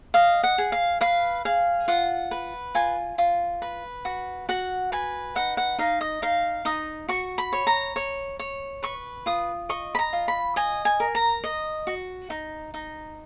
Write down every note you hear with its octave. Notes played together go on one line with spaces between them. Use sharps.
D#5 F5
F#5
G#4
F5
B4 F5
G#4 F5
F4 F#5
B4
F4 G#5
F4
B4
F#4
F#4 F#5
B4 G#5
D#4 F#5
F#5
D#4 F5
D#5
D#4 F5
D#4 D#6
F#4 C#6
B5
C#5
A#5
C#5
C#5
B4 C#6
F4 D#6
D#5 C#6
B5
A#5
F4
B5
D#5 G#5
G#5
A#4
A#5
D#5
F#4
D#4
D#4